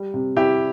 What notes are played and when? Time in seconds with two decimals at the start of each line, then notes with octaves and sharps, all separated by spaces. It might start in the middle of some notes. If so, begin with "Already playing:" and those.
Already playing: G3
0.14 C3
0.36 C3 E4 G4